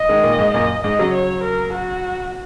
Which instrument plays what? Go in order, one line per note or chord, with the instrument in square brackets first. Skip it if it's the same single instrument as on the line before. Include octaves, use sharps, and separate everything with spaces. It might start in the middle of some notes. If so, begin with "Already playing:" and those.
Already playing: [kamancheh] D#5
[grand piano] D#3 G#3
A#2 D#3
G#2
[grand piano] F#2 A#2 [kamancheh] D#5
[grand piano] G#2 [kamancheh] D#5
[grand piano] C#3 F#3
[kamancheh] C#5
A#4
F#4